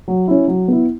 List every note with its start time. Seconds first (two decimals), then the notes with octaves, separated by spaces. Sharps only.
0.08 F#3
0.28 C#4 E4
0.48 F#3
0.68 B3 E4